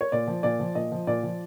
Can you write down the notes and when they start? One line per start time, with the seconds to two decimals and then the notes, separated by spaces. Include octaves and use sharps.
0.01 C#5
0.12 A#2 D5
0.27 F3
0.43 A#2 D5
0.59 F3
0.75 A#2 D#5
0.92 F3
1.07 A#2 D5
1.23 F3